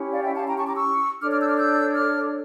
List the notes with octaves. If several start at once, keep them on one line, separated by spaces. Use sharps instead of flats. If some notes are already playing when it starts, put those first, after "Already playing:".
Already playing: C#4 E4 G4
D5 F5
E5 G5
F5 A5
G5 A#5
A5 C#6
A#5 D6
C#6 E6
D4 A4 C#5 D6 F6
D6 F6
E6 G6
D6 F6
E6 G6
D6 F6